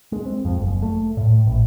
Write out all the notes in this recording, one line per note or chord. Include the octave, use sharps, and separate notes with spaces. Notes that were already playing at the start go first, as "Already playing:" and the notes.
G#3
C4
F2
F#1
A3
A2
A1